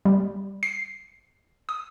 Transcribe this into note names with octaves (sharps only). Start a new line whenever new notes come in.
G3
C7
D#6